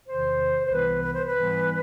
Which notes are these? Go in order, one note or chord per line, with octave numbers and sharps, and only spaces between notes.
E2 C3 D#3 C5
C5
C2 C3 E3 G3 B3 B4
B4
C5
B4
G#2 E3 G3 B3